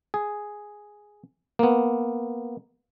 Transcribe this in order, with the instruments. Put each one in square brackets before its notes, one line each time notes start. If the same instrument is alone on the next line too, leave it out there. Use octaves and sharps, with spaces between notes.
[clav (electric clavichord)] G#4
A#3 B3